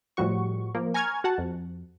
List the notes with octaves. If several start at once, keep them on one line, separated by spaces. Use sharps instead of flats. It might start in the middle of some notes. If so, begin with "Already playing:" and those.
A2 F3 G3 F#4 C#6
F3 A#3
G#5 A#5 C#6 F6 G#6
F#4 F#5 A5
F2